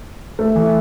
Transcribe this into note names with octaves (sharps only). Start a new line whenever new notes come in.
A3
E3 E4